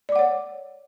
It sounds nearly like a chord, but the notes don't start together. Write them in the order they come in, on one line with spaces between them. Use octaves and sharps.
D5 D6 F#5 C#5